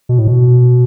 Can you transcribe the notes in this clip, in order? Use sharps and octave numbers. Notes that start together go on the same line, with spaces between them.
B2
A2
B2